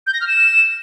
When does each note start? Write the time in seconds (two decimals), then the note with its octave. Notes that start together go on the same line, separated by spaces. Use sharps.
0.07 G6
0.14 A#6
0.21 F6
0.28 E7